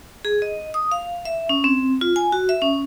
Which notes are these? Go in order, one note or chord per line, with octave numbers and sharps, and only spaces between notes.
G#4
D#5
D#6
F5
E5
C#4
C4
F4
G#5
F#4
E5
C#4